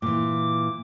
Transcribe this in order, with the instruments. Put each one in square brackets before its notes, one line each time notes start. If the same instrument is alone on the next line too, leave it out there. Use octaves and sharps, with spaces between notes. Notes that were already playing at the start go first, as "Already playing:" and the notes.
[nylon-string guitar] A#2 E3 [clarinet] D6